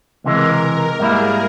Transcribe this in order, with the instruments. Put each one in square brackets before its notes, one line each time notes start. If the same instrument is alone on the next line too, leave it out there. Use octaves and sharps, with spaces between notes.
[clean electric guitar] C#2 C3 E3 G#3 [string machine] A#4
[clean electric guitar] G#2 G3 A#3 E4 [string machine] G#4